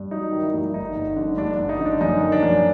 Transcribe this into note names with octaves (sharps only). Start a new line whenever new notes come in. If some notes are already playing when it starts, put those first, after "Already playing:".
Already playing: G2
F#3 D#4
D#3
E4
G2
G1 D#4
G1
D3
G2 D4
D4
G1
D#4
D3
D4
F#2 D#4
D#3
D4
F#2